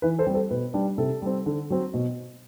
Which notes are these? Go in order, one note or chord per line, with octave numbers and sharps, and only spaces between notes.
E3 B4
A4 C5
G3 C4
A4 C5
B2 B4
G3 D4
C3 A4
G3 C4
D3
F#3 C4
B2